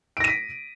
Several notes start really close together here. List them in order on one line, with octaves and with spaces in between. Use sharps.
D7 A#6 D#7 B6